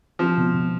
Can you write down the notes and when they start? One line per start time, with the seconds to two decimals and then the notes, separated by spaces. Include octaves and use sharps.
0.19 F3 C4
0.37 B2
0.54 B2